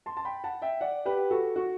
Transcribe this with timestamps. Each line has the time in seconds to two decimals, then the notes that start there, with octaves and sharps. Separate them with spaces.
0.06 A5 C6
0.17 A5
0.25 G5 B5
0.44 F#5 A5
0.62 E5 G5
0.81 D5 F#5
1.05 G4 B4
1.31 F#4 A4
1.56 F#4